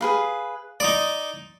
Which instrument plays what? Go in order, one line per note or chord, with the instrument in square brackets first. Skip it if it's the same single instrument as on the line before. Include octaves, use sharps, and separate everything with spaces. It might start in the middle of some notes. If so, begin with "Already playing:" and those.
[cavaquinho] G#4 B4 F5
[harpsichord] D#4 D5 [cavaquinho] C6 D#6